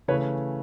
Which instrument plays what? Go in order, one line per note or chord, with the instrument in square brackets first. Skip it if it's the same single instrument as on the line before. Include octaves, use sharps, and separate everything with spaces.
[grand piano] C#3 E3 A3 B4 C#5